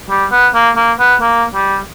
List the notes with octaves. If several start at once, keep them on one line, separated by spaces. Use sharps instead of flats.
G3
B3
A#3
A#3
B3
A#3
G3